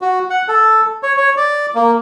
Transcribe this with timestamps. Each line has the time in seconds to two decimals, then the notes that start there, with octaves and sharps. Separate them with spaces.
0.02 F#4
0.30 F#5
0.48 A4
1.03 C#5
1.17 C#5
1.37 D5
1.75 A#3